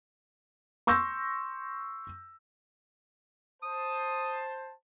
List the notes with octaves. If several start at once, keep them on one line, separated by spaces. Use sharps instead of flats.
C6 C#6 E6 G6 A#6
C5 A5 D#6